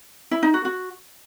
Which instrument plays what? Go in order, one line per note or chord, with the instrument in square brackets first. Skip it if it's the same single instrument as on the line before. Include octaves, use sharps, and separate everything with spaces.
[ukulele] E4
D#4
F#4
F#4